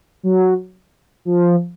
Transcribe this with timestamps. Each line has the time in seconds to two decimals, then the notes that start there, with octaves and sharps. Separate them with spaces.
0.23 F#3
1.25 F3